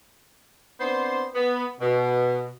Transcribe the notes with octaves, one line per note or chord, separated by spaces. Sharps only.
B3 C4 D4 C5
B3
B2